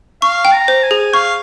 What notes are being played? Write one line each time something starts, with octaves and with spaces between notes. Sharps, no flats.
F5 C#6
G5
A#5
C5
G#5
G#4
F5 C#6